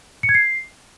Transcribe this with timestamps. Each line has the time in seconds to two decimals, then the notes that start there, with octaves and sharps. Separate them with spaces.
0.23 C#7
0.29 G#6
0.34 C7